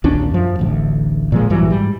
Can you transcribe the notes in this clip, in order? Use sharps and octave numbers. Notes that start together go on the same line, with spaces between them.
A#1 D#2 C#4 D4
F#2 F3
D1 A1 D2
A#2 F3 G#3
A#1 G2 E3 F#3
G#2 G3